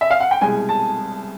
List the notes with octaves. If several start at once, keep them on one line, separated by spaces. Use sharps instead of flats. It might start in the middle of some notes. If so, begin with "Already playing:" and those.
E5
F5
F#5
G5
C2 B2 G#3 G#5
A5